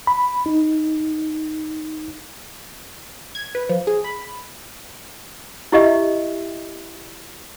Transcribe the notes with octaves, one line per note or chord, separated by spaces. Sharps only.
B5
D#4
G#6
B4
F3
G#4
B5
E4 G4 D#5 E5